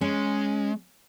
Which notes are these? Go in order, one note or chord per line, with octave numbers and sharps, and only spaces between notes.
G#3 C#4